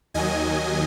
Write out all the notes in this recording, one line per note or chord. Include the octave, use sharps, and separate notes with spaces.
D#2 D#3 F#3 D#5 G#5